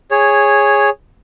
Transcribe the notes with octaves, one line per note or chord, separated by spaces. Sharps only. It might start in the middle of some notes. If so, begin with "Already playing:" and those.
G#4 C#5